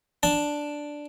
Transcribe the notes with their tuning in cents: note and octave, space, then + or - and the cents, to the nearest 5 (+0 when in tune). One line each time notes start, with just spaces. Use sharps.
D4 +0 A5 +0